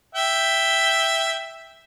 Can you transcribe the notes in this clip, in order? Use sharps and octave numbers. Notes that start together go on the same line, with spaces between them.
E5 G5